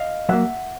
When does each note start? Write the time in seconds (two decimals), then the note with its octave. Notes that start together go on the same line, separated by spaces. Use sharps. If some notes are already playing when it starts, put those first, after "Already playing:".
Already playing: D#5 F5
0.29 F#3 A#3 E5 F#5